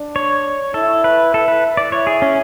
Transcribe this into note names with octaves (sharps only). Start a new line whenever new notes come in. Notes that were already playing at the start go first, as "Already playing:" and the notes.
Already playing: D4
C#5
E4 A4
B4
A4
B4
D5
E4 C#5
G#4
C#4